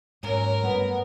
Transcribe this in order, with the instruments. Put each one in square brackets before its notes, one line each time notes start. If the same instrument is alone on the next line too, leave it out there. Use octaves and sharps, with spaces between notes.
[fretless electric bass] G#2 [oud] F#3 A#3 C#4 [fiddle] A#4
[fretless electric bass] G2 A3 [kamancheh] B3